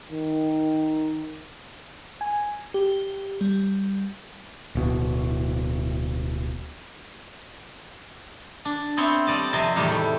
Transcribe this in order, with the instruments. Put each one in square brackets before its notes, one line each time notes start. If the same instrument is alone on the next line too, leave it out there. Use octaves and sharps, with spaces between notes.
[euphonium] D#3
[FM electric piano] G#5
G4
G3
[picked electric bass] D1 B2
[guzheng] D4
B3 C4 C#5 E5 C6
G3 D5 D#5 A5
F2 C3 D#5 E5 A5
E2 A2 D#3 G3 G4
A3